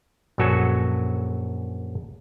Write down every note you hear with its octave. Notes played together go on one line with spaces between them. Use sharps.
A#1 F#2 F#3 F#4 A4 G#5